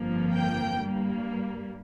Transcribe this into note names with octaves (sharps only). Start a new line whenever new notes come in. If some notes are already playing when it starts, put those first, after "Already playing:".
Already playing: G1 F2 F3 A#3
G5
G2 G3 A#3